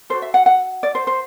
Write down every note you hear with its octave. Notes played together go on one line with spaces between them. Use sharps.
F#4 A4 C5
E5
F#5
F#5
D5
C5
C5